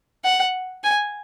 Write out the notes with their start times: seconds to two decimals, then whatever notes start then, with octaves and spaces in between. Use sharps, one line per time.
0.24 F#5
0.84 G#5